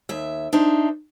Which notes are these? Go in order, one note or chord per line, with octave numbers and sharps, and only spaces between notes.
D#2 E5
D4 D#4 C5 E5